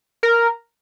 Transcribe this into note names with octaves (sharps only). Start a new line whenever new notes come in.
A#4